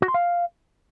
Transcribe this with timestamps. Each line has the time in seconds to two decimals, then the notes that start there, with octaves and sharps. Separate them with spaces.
0.02 F#4
0.08 C6
0.14 F5